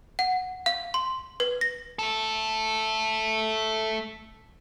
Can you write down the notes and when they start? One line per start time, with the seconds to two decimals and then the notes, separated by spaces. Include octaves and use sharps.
0.19 F#5
0.66 F5
0.94 C6
1.40 B4
1.61 A#6
1.99 A3 A4